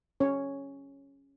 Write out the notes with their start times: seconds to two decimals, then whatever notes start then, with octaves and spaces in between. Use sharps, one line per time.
0.20 C#4 C#5